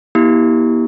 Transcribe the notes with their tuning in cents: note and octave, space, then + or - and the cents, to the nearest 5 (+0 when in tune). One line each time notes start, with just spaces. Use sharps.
B3 -45 E4 -30 G4 +0